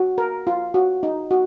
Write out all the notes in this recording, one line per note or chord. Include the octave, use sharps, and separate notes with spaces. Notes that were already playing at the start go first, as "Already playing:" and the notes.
Already playing: F#4
A#4
F4
F#4
D#4
F#4